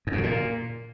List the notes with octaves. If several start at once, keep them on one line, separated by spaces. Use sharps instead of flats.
G#2
F#2
D3
A#2